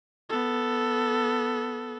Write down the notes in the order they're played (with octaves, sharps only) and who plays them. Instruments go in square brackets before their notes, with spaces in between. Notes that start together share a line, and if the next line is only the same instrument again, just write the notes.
[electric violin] B3 A4